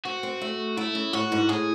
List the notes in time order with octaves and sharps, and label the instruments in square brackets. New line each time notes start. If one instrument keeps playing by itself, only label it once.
[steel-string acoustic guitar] C4 [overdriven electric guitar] F#4
[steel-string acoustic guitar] C4
A3
[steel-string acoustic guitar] A3 [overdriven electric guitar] E4
[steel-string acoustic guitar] C#3
[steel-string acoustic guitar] A2 [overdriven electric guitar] F#4
[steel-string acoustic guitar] G#2
[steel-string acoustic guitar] A2 [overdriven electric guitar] G#4